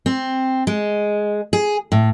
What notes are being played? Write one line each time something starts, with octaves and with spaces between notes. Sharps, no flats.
C4
G#3
G#4
A2